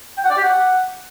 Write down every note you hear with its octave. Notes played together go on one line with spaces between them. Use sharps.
G5
F#5
D5
G4
F#5